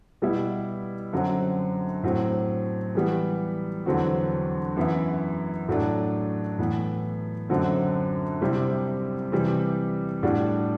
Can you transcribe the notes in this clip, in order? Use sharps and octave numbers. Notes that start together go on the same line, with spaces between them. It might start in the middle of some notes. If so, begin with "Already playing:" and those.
B2 G3 B3 E4
F#2 D3 F#3 C4 F#4
A2 F#3 C4
E3 G3 B3
E2 D3 F#3 C4 F#4
F#2 E3 B3 E4
A2 F#3 A3 D4
A2 E3 B3
F#2 D3 F#3 C4
C3 G3 C4 E4
C3 E3 G3
A2 G3 D4 F#4